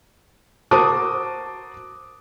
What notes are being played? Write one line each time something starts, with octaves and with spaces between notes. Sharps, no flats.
F#4 A#4 C5 A5 D6 D#6